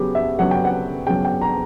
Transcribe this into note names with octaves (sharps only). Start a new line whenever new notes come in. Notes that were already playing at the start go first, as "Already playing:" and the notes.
Already playing: C#3 F#3 B3 G4
E5
C#3 F#3 B3 F#5
G5
F#5
C#3 F#3 B3 G5
G5
A#5